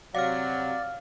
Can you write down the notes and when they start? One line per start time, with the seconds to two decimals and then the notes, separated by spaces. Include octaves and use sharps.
0.15 C3 F#3 D5 F5 F6